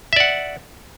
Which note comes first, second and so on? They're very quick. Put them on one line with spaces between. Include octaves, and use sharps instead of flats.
E5 D5 F#5